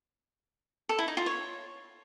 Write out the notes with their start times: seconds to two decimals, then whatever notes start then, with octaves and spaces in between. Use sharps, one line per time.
0.89 A4
0.99 E4
1.08 D#4
1.17 F4
1.26 C#5